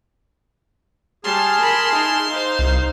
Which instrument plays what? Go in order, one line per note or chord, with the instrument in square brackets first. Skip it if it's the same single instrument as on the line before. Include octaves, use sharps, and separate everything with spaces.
[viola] G3 [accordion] G#4 A5 F6 [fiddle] C6
[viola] A#4 B5
D#4 E4
[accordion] D#4 [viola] C5 F5
[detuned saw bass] C2